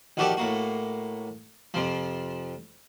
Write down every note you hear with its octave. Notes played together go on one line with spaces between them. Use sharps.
A#1 D#3 F#4 G4 A4 D5
A2 A#3 F#4
F2 C3 F3